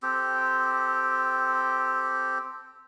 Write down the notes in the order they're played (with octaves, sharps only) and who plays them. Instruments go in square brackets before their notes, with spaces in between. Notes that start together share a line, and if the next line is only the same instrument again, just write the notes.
[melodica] C4 G4 A4